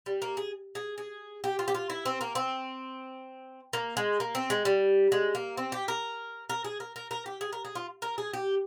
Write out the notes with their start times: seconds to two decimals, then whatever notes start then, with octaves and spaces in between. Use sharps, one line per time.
0.06 G3
0.22 A#3
0.37 G#4
0.75 G#4
0.98 G#4
1.44 G4
1.59 F4
1.68 G4
1.74 F4
1.90 E4
2.05 C4
2.21 A#3
2.35 C4
3.73 A#3
3.97 G#3
4.20 A#3
4.35 C4
4.50 G#3
4.65 G3
5.12 G#3
5.35 A#3
5.57 C4
5.72 G4
5.88 A#4
6.49 A#4
6.64 G#4
6.80 A#4
6.96 A#4
7.11 A#4
7.26 G4
7.41 G#4
7.53 A#4
7.65 G#4
7.75 F4
8.02 A#4
8.18 G#4
8.34 G4